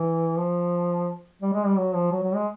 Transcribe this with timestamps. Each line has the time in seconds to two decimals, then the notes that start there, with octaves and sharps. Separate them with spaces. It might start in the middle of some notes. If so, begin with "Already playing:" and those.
Already playing: E3
0.38 F3
1.42 G3
1.53 G#3
1.66 G3
1.77 F#3
1.94 F3
2.12 F#3
2.23 F#3
2.34 G#3